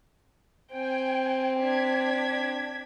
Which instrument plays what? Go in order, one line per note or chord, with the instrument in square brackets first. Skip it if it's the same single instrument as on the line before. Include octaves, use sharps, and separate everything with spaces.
[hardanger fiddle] C4 [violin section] G5 G#5
[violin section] D4 G#6 B6